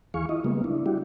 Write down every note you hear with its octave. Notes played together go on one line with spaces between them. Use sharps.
D#2 E3 G#4 F5 C#6
E4 F4 D#5
C#3 G3 G#3 A#3 B3
D4 E4
G3 D4 E4 F#4 G4